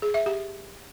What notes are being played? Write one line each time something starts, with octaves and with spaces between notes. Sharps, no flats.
G#4
E5
G4